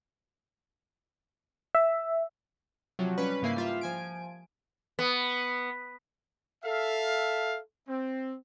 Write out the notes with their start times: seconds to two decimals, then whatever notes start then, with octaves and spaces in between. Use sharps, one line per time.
1.75 E5
2.99 C3 F3 F#3
3.18 G3 C#4 B4
3.42 G#2 C#3 A#3 E4 G#5 C7
3.56 G3 F4 E5
3.81 F3 G#5 D7
4.99 B3
6.64 A4 E5 F5
7.88 C4